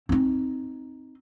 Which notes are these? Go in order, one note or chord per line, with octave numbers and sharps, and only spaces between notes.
C4 D#4